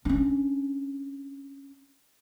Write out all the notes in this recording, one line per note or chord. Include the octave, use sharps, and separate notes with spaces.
C#4 D4